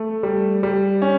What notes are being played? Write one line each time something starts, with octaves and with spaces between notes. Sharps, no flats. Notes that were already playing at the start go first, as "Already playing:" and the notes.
Already playing: A3
G3
G3
C#4